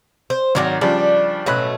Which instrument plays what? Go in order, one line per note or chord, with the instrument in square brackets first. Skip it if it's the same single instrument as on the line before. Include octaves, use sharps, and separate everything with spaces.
[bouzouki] C5
[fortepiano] G#1 D5 [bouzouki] D#3 F#3 A#4
[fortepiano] C#3 F3 G3 [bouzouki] D4
[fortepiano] A1 B5 F#6 [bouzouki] B2 F#3 A3